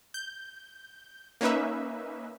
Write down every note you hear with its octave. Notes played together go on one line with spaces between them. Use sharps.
G6
A#3 C#4 D#4 B4 E5